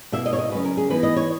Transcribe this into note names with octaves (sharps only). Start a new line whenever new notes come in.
B2 A#3 E4 E5
D#5
C#5
D#5
C#3 F#3 C#4 B4
A#4
G#4
E3 B3 D#4 B4
D#5
C#5